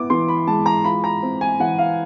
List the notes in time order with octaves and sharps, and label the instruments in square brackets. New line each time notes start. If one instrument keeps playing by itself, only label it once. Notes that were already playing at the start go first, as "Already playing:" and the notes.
Already playing: [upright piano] B3 E4 D6
E3 C6
B5
G#3 A5
A#5
F4 B5
A#5
C4
G#5
E3 F#5
F5